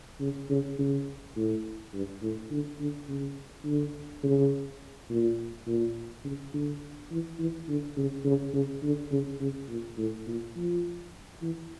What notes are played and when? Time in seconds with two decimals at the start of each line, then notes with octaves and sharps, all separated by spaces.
0.21 C#3
0.50 C#3
0.78 C#3
1.36 A2
1.93 G2
2.22 A2
2.51 D3
2.80 D3
3.09 C#3
3.65 D3
4.23 C#3
5.10 A#2
5.67 A#2
6.24 C#3
6.53 D3
7.11 E3
7.39 E3
7.68 D3
7.97 C#3
8.25 C#3
8.54 C#3
8.83 D3
9.12 C#3
9.40 C#3
9.69 A#2
9.98 A2
10.27 A#2
10.56 F3
11.42 E3